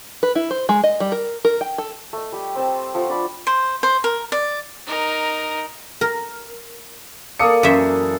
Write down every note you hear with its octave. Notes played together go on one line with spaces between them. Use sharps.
B4
E4
C5
G#3
D#5
G3
A#4
A#4
G5
A4
A3 D#5
G3 G4
C4 C5 D#5 A5
C6
F3 A3 F#5 C#6
D4 D5 B5
C5
C5
A#4
D5
D#4 A#4
A#4
A#3 A4 D5 F5 D#6 C#7
F#2 E3 C5 E5